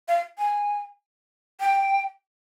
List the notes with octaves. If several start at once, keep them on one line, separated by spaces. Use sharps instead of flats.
F5
G#5
G5